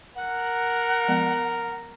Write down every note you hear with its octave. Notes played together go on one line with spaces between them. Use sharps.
A#4 F#5
F3 G#3 B3